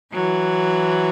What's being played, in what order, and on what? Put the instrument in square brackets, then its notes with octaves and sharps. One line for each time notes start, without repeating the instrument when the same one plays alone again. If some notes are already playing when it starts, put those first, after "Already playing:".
[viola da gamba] E3 F#3